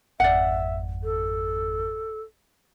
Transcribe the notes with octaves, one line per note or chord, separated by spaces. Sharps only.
G#1 F2 D5 E5 F#5
A4